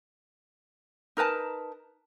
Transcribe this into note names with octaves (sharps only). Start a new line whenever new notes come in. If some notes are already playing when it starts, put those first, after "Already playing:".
D#4 A#4 B4 A5